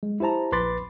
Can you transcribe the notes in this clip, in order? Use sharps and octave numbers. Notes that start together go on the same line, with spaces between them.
G#3
E4 G4 C5 A5 A#5
A#1 B4 B5 C6 D6 A6